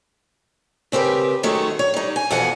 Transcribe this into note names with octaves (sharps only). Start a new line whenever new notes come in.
C#3 C4 G4 A#4 B4
D#3 F#3 G#3 A3 C#4
C#5
G3 D#4
G#5
F2 B2 E3 F#5 G#5